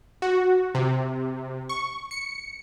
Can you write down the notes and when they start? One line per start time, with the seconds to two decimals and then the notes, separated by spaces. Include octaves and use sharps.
0.22 F#4
0.75 C3
1.69 C#6
2.11 C#7